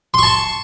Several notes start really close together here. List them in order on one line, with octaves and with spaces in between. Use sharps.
C6 C#6 A5